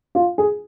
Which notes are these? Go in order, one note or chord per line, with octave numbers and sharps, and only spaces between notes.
F4
G#4